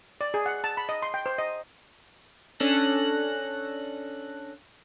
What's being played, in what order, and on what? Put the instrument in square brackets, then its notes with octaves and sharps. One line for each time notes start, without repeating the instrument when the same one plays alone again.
[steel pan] D5
G#4
F#5
A5
B5
D#5
C6
G5
C5
D#5
[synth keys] C#4 D4 A4 F#6 A#6